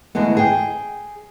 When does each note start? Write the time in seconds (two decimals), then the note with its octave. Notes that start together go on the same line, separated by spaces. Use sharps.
0.15 D2 D3 E3 G#3 B3
0.37 G#4 G5